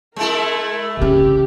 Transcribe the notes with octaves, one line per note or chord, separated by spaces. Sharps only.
G#3 A3 E4 A#4
C#3 C#4 G4